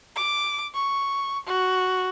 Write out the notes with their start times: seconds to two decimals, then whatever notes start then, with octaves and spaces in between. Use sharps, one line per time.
0.16 D6
0.74 C#6
1.46 F#4